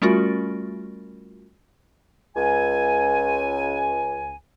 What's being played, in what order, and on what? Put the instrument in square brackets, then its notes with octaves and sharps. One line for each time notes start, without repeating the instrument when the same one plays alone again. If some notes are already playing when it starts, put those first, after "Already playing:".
[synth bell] G3 A3 C#4 F4 F#4 A#4
[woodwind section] C#2 G#5